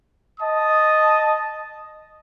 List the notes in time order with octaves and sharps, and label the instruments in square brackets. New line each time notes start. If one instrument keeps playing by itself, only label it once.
[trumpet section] D#5 A5 D#6